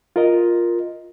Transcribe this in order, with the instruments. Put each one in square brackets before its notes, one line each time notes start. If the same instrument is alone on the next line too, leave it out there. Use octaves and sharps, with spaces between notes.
[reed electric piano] F4 A#4 D#5